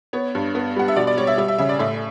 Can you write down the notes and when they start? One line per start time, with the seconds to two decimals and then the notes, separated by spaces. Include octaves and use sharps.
0.13 B3 C#5
0.35 G2
0.55 B3
0.76 G3 F#5
0.88 E5
0.96 B2 D5
1.07 D5
1.17 G3 C#5
1.27 E5
1.37 G3 E5
1.48 E5
1.58 C#3 E5
1.69 D5
1.79 A2 E5